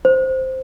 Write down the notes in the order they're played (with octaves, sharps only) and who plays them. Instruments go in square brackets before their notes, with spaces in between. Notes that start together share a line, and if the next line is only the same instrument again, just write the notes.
[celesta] C5